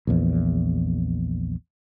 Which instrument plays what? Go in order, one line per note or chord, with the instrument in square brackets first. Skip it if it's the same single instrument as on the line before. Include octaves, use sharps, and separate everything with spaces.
[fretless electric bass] A#1 E2